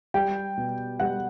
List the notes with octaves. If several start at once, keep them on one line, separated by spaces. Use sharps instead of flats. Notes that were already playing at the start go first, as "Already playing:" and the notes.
G3 G5
B2
G3 F#5